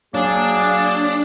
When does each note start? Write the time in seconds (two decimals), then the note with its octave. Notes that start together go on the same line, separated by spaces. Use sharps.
0.14 F#3 A#3 D4 G#4 D5